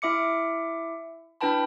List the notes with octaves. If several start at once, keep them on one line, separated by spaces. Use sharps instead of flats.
E4 E5 D6 C#7
D4 E4 B4 G5 A5 B5